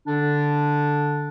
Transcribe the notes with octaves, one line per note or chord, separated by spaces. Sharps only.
D3 D4